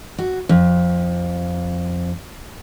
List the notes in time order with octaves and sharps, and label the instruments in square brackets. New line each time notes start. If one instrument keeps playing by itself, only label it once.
[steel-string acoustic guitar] F#4
F2